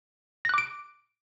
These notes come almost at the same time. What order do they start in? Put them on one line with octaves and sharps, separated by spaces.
A#6 F#6 D6 D7